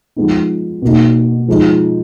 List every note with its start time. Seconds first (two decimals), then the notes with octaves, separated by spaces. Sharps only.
0.16 F3 G#3 B3 D#4
0.82 B2 A#3 D#4
1.48 F3 G#3 D#4